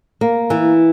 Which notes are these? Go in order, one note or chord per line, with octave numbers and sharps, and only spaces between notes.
A#3
E3